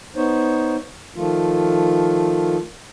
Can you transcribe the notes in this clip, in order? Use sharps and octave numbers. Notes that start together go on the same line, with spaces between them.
B3 D#4 C5 C#5
D#3 F3 A3 F4